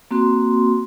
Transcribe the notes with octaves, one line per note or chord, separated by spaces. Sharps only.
A#3 C4 F#4 C6